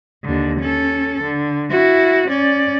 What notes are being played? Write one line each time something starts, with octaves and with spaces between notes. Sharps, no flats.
D#2 D3
C#4 A4
D3
E4 F#4
C#4 D5